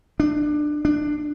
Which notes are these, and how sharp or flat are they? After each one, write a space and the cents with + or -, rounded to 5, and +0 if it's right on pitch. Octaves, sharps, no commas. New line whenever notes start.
D4 +20
D4 +15